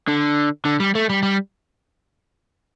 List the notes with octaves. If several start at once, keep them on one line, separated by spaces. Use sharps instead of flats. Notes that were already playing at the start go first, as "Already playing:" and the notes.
D3
D3
G3
A3
G3
G3